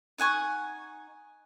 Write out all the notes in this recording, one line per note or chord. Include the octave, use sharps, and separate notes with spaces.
D#4 F#5 G#5 C#6